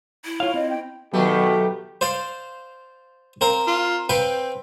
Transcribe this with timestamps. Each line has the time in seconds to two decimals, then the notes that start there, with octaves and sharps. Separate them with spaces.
0.25 E4
0.40 F4 C#5 F5
0.54 C4 D#5
0.69 G5
1.14 B2 D#3 F#3 A3 G4
2.01 C5 D5 F5
3.41 C4 A#4 F5
3.67 F4
4.09 C4 B4 F5 G5